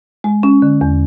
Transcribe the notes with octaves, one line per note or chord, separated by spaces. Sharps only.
G#3
C#4
D3
E2